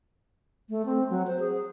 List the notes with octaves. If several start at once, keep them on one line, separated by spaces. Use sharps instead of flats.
A3
C4
F#3
C5
G#4